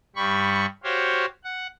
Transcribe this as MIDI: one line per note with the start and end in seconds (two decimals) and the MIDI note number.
0.16 0.66 43
0.16 0.66 55
0.16 0.66 83
0.16 0.66 85
0.84 1.26 66
0.84 1.26 67
0.84 1.26 72
0.84 1.26 73
0.84 1.26 77
1.44 1.67 78